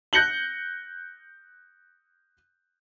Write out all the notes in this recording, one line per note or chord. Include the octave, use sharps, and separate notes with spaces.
F#6 G6 A#6 C#7 F#7 G7